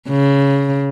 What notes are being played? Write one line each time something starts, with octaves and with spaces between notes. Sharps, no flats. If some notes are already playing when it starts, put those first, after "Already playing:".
C#3